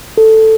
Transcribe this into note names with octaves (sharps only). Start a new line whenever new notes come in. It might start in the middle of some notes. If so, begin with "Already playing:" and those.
A4